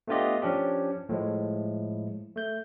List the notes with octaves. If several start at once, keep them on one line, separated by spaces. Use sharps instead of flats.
A3 B3 D4 F4 G4 D#5
F3 C#4 D4 G4
A2 F3 G#3
A3 G6